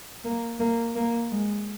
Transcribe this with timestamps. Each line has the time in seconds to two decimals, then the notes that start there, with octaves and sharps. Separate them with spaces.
0.25 A#3
0.60 A#3
0.95 A#3
1.31 G#3